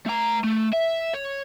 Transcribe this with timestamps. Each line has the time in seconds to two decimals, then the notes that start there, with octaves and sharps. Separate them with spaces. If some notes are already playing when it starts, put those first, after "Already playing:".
0.06 A3 A#5
0.44 A3
0.73 E5
1.13 C#5